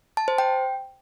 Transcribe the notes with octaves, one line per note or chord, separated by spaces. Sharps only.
A5
C5
G5